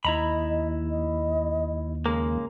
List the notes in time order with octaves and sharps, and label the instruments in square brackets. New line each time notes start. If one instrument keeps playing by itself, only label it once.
[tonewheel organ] D#2 [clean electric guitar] E4 A#5 B5 [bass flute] D#5
[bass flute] D#5
[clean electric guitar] C#3 G#3 A#3